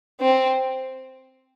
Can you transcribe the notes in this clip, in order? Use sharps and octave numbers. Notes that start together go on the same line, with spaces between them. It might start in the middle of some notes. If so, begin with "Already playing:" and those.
C4